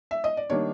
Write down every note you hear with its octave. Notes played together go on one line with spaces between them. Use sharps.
E5
D#5
D5
D#3 G3 A#3 D4 C#5